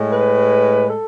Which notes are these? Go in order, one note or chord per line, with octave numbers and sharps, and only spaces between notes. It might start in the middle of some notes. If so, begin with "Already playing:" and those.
Already playing: A2 G#3
B4
A4